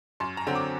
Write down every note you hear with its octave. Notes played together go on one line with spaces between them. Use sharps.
F#2 C6
A#5
D3 F#3 C4
D6